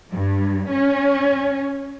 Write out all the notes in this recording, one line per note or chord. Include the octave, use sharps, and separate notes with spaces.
G2
C#4